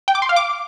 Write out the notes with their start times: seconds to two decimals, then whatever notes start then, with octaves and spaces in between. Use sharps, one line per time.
0.08 G5
0.15 D6
0.22 C6
0.29 F5
0.36 D6